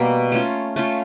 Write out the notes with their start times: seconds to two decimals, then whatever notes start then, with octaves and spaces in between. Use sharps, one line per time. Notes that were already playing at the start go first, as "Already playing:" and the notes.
Already playing: B2 G3 A#3
0.32 A3 C#4 F4
0.76 A3 C#4 F4